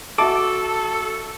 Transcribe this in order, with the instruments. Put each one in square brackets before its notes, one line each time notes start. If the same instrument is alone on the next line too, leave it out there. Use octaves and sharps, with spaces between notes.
[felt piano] F#4 E5 A5 [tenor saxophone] A4 [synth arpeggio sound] D6